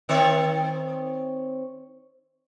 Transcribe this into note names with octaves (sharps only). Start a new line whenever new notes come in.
D#3 C4 C#5